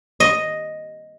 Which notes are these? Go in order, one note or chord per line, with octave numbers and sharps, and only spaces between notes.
D#5